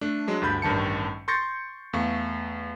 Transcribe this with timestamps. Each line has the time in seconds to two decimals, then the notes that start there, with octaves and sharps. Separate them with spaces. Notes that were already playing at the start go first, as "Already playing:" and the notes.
0.01 A3 D4
0.27 F#3 G#3 D4
0.42 D2 G2 D3 B5 G6
0.62 A1 G2 D#3 A5 C#7
1.28 C6 C#6 G6 A6 A#6 C#7
1.93 E2 A3 F5 C#6